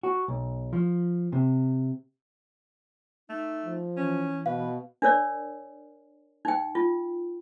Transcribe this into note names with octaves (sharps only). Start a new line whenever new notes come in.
F#4
B1
F3
C3
A3 D#4
F3
E3 C#4
B2 B4 F5
D4 A#4 C#5 D5
D#4 G5
F4